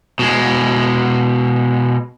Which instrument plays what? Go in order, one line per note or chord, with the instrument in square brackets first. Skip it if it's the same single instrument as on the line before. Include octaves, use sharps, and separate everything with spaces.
[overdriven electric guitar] B2 G#3